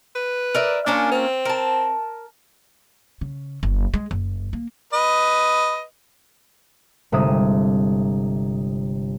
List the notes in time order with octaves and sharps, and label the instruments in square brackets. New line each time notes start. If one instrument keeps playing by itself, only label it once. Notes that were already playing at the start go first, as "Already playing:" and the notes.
[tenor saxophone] B4
[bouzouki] A#4 D5 E5
[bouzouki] A#3 C#4 F4 [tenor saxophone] D4
[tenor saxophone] C4
[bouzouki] A#4 A5
[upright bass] C#3
F#1
G#3
F#1
A#3
[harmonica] B4 D#5
[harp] G1 C3 G#3 E5 D#6